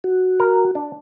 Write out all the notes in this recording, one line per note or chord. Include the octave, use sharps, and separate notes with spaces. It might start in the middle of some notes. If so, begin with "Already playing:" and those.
F#4
A#4
D4